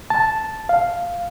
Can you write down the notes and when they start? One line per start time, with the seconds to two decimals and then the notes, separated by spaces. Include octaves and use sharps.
0.10 A5
0.69 F5